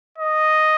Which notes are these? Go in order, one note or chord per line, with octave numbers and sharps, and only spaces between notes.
D#5